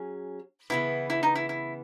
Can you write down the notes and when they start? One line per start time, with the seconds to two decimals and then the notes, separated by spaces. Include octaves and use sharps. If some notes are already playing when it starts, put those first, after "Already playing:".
Already playing: F#3 C#4 G#4
0.70 C#3 E3 B3 E4
1.10 E4
1.23 D#4
1.36 E4
1.49 E4